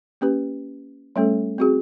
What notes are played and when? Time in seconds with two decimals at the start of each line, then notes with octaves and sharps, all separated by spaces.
0.21 A#3 C#4 G4 B4
1.16 G3 A3 C#4 A4
1.58 C4 F#4 G#4